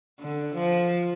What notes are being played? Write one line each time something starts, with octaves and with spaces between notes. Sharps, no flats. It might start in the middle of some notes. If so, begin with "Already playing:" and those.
D3
F3